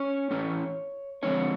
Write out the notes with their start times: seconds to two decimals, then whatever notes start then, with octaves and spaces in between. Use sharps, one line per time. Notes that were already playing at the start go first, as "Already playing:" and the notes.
Already playing: C#4 C#5
0.30 A2 E3 A3 C#4
1.23 D3 F3 G#3 C4 C#4 C#5